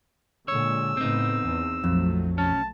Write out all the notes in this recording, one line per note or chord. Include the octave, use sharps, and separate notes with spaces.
A#2 D3 G#3 C#5 E6
A2 C#3 B3 C4 D#4
E2
A#1 F2 F#3 A3
B1 C#4 A5